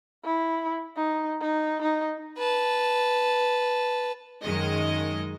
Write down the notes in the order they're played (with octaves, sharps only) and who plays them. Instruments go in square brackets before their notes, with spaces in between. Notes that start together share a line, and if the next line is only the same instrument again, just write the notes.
[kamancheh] E4
D#4
D#4
D#4
[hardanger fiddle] B4 A5
[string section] F#2 D#3 G#3 D#5